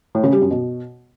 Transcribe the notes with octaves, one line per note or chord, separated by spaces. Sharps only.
A2
C#3
G3
F#2
B2